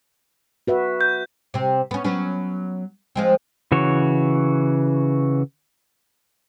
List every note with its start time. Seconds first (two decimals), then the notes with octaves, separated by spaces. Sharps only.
0.67 F#4 B4 E5
1.01 G6
1.54 C3 C4
1.91 B3 C#4
2.04 F#3 B3 C#4
3.16 F3 G#3 C4
3.72 C#3 E3 F#4 C#5